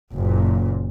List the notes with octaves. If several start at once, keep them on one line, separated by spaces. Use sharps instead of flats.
F#1 A#2